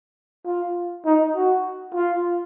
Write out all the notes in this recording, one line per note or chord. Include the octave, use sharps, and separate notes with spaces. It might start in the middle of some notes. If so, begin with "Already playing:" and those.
F4
D#4
F#4
F4